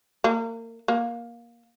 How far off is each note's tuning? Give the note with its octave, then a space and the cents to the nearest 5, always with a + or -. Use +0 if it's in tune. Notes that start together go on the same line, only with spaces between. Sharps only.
A#3 -30
A#3 +15